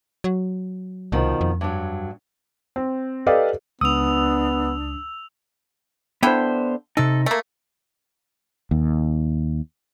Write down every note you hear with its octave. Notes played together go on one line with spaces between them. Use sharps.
F#3
C2 B2 D#3 F3
F2
G2 F#3
C4
G4 A4 B4 D5 D#5 F5
C#2 B3 D4 D#6 E6 F7
D3 B3 E4 C5 G5
C3 D#4 A4
A3 A#3
D#2